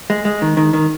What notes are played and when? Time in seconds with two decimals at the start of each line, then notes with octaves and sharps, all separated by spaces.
0.10 G#3
0.25 G#3
0.42 D#3
0.57 D#3
0.73 D#3